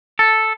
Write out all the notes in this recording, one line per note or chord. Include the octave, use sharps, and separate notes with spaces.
A4